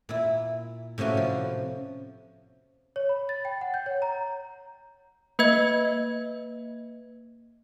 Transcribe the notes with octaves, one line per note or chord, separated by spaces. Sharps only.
A#2 E4
A2 C3 A#3 C#4 F#4
F3
C#5
B5
A6
G5
F#5
G6
C#5
A#5
A#3 B4 D#5 E5 G#6